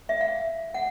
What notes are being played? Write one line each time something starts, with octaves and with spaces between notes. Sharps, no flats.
E5
F5
F#5